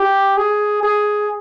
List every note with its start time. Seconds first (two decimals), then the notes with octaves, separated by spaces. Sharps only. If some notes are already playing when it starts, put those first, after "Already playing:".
Already playing: G4
0.37 G#4
0.83 G#4